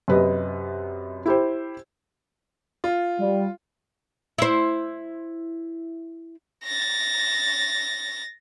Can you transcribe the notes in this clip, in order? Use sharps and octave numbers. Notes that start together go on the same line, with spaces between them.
F#2 C3 B4 D#5
E4 G4 C5
F4
G3
E4 C5
A6 A#6